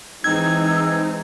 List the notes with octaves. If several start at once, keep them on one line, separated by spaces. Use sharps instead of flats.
E3 G#3 C4 D#4 E6 G#6